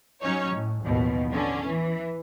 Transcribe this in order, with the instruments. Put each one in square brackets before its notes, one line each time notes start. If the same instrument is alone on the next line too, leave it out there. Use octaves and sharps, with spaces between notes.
[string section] F#3 C#4 D#4 C#5
A2
A1 D#2 B2 F3
D3 C#4
E3